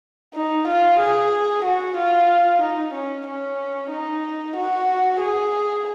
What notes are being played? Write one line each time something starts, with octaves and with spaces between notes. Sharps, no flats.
D#4
F4
G#4
F#4
F4
D#4
C#4
C#4
D#4
F#4
G#4